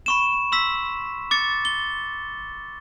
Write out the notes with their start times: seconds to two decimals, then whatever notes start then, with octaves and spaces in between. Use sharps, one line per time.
0.06 B5 C#6 E7
0.52 C6 E6 B6
1.31 D6 A6 C#7
1.65 G7